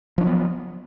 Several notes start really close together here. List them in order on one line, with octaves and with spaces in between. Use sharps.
F3 D4 F#3 B3